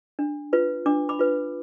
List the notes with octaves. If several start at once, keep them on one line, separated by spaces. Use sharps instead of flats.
D4
F4 B4
D4 D6
B5 D6
F4 B4